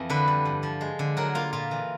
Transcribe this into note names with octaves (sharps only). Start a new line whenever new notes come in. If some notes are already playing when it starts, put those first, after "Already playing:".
Already playing: F2 E3
D3 B4
G3
G2
F3
G#3
D3
F#3 A#4
A#3 F4
A#2 F4
E3